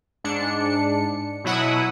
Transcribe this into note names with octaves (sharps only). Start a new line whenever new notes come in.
G#2 D4 C#7
B2 F#3 E4 F#5 D#6